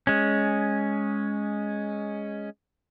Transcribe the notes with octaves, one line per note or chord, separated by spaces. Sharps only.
G#3 C#4